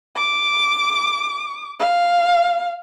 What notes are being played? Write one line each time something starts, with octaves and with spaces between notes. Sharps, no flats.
D6
F5